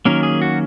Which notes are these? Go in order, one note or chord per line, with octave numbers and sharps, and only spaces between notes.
D#3 F#3 A#3 C#4 A#4
G#4
F#4